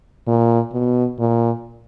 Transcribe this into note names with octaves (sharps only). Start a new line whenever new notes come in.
A#2
B2
A#2